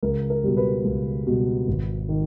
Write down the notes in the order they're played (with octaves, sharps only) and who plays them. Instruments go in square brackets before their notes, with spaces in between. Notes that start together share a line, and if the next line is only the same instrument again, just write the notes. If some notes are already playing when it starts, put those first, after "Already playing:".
[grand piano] C#2 A#4
A#4
B2 G3
B4
C#2
B2 G3
G#1
D#3